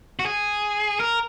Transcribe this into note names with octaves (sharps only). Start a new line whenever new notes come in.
F#4
G#4
A#4